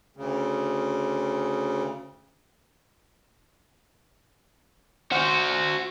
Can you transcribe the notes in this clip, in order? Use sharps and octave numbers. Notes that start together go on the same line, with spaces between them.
D2 C#3
F#4 C5